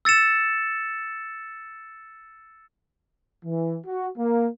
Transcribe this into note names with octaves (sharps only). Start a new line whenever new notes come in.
E6 A6 C#7 E7
E3
F#4
A#3